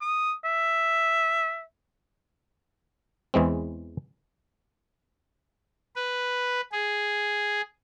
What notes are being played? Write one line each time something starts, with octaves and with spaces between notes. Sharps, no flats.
D#6
E5
E2 E3 G#3 C4
B4
G#4